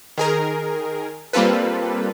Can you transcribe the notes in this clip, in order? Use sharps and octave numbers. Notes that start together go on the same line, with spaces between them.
D#3 G#4 A#4
G3 A#3 C4 F4 A4 B4